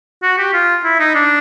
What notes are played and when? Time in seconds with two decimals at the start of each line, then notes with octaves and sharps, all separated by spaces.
0.23 F#4
0.38 G4
0.54 F4
0.85 E4
1.00 D#4
1.15 D4